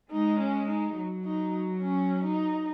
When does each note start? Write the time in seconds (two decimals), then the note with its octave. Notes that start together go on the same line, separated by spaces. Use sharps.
0.11 G#3 D#4
0.40 C#4
0.68 D#4
0.96 F#3
1.25 D#4
1.82 C#4
2.24 D#4